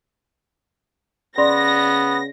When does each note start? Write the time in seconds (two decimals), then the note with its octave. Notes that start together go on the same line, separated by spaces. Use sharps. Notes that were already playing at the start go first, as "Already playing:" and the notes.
1.38 C#3 B3 D5 B5 C6 A#6